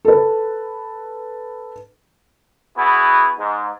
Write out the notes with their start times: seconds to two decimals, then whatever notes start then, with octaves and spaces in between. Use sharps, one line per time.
0.05 A4 B4
2.75 B3 E4 F#4 G#4
3.38 G#2